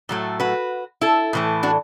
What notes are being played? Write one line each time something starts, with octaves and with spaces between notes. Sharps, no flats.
A2 F#3 A3
F#4 B4
E4 A4
A2 E3 A3
D4 F#4